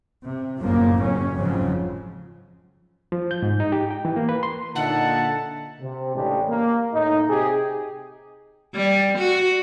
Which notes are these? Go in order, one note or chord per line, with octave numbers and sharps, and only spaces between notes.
C3
G1 F#2 A2 C#3 F3 A#3
F#1 F2 F#3 C#4
F2 G#2 C#3 F3 F#3
F3
G6
G#2
D#4
G4
G5
E3
A#3
B4
C6
A#2 D3 D#4 E5 F#5 A5
C3
A1 C#3 G#3 D4 G4
A#3
A2 D#4
C3 G4 G#4
G3
F#4